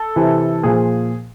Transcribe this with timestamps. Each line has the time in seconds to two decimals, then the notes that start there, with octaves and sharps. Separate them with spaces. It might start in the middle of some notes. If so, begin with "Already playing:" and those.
Already playing: A4
0.16 C3 E3
0.63 A#2 F3 G#4